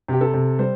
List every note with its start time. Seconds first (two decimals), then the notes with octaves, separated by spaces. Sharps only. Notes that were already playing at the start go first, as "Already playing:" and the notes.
0.08 C3 G4
0.21 A4
0.34 C3
0.59 G3 C5